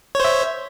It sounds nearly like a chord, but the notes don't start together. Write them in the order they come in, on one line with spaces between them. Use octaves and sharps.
C#5 C5 E5